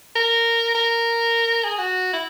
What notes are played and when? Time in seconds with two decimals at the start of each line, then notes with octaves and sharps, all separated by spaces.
0.16 A#4
0.75 A#4
1.64 G#4
1.79 F#4
2.13 E4